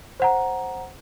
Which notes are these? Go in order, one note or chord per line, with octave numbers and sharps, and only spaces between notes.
C5 F#5 A#5